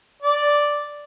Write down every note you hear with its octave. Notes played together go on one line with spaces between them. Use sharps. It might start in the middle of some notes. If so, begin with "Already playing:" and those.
D5